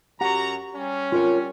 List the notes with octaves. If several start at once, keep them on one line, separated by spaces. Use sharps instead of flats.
F#2 F#4 G4 F#5 A#5
G3 C#4
F4 A#4 C#5